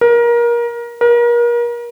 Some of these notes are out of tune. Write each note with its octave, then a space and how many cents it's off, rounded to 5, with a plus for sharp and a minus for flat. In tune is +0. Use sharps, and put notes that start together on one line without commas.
A#4 +25
A#4 +35